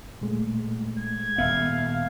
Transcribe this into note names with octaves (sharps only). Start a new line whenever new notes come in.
A#2 G#3 A3
G#6
D#1 B3 E5 F5